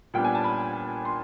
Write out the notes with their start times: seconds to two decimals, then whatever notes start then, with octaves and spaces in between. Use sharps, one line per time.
0.14 A#2 G3 B3 D4 G5
0.25 G#5
0.35 A5
0.44 B5
1.05 C6